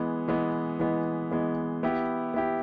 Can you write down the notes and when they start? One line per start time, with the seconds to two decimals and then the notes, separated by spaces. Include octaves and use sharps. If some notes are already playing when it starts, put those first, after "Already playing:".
Already playing: E3 G#3 B3
0.28 E3 G#3 B3
0.79 E3 G#3 B3
1.31 E3 G#3 B3
1.83 B3 E4 G4
2.34 B3 E4 G4